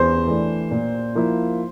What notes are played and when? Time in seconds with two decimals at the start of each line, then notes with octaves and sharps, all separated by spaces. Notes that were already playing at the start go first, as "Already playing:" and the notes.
Already playing: E2 C5
0.27 E3 A3 D4
0.71 A#2
1.15 F3 A#3 E4